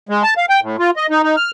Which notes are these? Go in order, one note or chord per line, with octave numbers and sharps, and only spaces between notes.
G#3
A5
F5
G5
A2
F4
D#5
D#4
D#4
F6